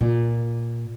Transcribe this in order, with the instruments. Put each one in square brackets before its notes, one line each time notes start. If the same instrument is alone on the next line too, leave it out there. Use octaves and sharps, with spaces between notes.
[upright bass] A#2